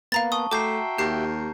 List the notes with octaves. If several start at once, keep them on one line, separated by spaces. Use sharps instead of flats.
A#3 B3 F5 A#5 A6
A5 C#6 D#6
A3 F#4 E5 G5 A#5 D6 G6 C7
D#2 G4 G6 C7